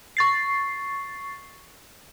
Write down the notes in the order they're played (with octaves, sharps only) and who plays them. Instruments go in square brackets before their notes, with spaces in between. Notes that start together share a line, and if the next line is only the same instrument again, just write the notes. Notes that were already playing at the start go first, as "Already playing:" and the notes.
[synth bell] C#6 A6 C7